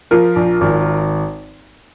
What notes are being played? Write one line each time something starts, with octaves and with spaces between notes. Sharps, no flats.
F3 F4 A#4
A#1
G#1